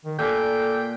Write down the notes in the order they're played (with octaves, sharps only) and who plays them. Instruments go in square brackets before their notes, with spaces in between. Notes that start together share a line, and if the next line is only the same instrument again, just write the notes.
[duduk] D#3
[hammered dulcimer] A#2 G#5 [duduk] A4 [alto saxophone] G5